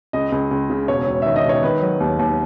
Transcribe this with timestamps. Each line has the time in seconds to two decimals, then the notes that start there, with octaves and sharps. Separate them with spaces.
0.13 C#2 D#5
0.32 C#2
0.51 C#2
0.70 C#3
0.88 E1 C#5
1.07 E1
1.22 D#3 E5
1.36 D#5
1.45 E1 C#5
1.63 D#3 B4
1.82 F#3
2.00 D#2
2.19 D#2